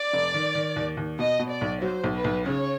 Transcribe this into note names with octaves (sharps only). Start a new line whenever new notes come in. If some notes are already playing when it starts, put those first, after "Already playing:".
Already playing: D5
F1
D#3
D#3
D#2
D#2
B2 D#5
B2
D5
B1
F#3 C5
B1
B4
B1
C#3 C#5